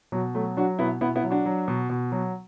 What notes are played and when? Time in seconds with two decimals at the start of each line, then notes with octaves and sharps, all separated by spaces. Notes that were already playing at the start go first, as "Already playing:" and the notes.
0.12 B2 F#3
0.35 F#3 A3
0.57 F#3 D4 F#4
0.79 B2 B3 E4
1.01 B2 B3 E4
1.16 B3 E4
1.24 F#3
1.30 D4 F#4
1.46 F#3
1.68 B2
1.90 B2
2.12 F#3